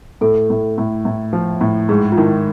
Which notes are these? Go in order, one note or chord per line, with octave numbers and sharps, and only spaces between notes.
A2 A4
A2
A2
A2
F3
A2
G#2 G#4
F4
D#3 E4